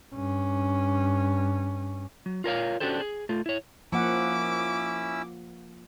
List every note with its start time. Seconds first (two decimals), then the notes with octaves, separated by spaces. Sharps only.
0.14 G2 C#4
2.26 F#3
2.44 F4 A#4 C#5 F5
2.80 C#4 D4 F#4 G4 A4 C5
3.00 G#4
3.29 A3 F4
3.46 E4 C#5
3.92 F3 A#3 C#4 E4 F#5 D6 E6